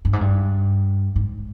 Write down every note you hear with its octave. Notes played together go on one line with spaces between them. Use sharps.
G2
G#2
G2
G#2